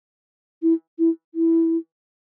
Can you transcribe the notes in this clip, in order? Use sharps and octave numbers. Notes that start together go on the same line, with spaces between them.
E4
E4
E4